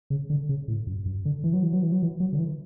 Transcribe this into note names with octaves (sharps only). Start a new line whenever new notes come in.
C#3
D3
C#3
A2
F#2
F#2
D3
E3
F#3
E3
F#3
E3
F#3
E3
F#3
D3
E3